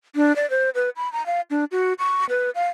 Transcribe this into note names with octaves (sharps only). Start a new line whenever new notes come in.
D4
D5
C5
B4
B5
A#5
F5
D4
F#4
C#6
B4
F5